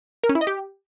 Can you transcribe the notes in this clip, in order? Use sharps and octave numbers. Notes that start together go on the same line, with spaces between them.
A#4
C#4
E4
D#5
G4